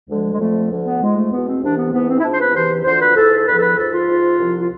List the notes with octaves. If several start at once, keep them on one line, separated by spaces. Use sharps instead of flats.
D2 D3 F3 G#3
G#3
F2 D3 F3 A3
D2 D3 F3
B3
G#2 F3 G#3
A3
E2 B2 B3
C4
C2 C3 E3 D4
B3
G#2 E3 B3
C4
E4
G#2 F3 D4
C5
B4
E2 C3 E3 C5
D2 D3 F3 C5
B4
G#2 E3 A4
A4
E2 D3 F3 B4
A4
B4
G#2 F3 A4
F4
G#2 F3
C2 C3 F3
F4